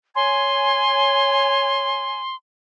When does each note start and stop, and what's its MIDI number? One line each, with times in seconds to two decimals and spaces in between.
0.16 2.22 73
0.16 2.22 80
0.16 2.35 84